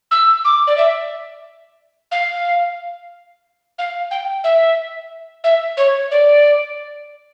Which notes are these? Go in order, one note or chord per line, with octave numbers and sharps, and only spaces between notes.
E6
D6
D5
E5
F5
F5
G5
E5
E5
C#5
D5